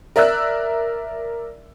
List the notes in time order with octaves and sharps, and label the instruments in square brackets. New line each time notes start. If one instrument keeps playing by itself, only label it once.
[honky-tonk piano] A#4 D5 E5 E6 F#6